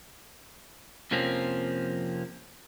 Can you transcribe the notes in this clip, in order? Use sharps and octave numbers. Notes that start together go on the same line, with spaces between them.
F2 C3 F3 A#3 C4 C#4